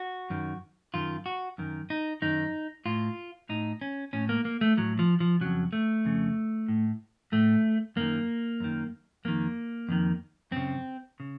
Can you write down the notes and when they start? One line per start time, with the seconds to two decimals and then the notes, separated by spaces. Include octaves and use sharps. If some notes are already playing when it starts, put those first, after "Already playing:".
Already playing: F#4
0.30 F#2 D#3
0.94 F#2 D#3 F4
1.26 F#4
1.58 F#2 D#3
1.90 D#4
2.22 F#2 D#3 D#4
2.86 A2 F4
3.49 A2 D#4
3.81 C#4
4.13 A2 C#4
4.29 A#3
4.45 A#3
4.61 A3
4.77 A2 F#3
4.99 F3
5.20 F3
5.41 F2 C#3 F#3
5.73 A3
6.05 F2 C#3
6.69 A2
7.32 A2 A3
7.96 F#2 D#3 A#3
8.60 F#2 D#3
9.25 F2 D#3 A#3
9.89 F2 D#3
10.51 F#2 C#3 C4
11.20 C#3